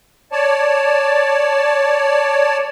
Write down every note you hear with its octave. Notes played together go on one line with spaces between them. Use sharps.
C#5 D5 A5